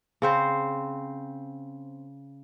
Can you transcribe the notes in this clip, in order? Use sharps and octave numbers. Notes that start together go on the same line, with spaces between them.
C#3 C4 C5